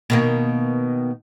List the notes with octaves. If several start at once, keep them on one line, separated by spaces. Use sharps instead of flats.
B2 D#3 A#3